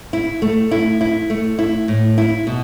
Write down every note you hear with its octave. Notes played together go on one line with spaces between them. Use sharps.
E4
A3
E4
E4
A3
E4
A2
E4
B2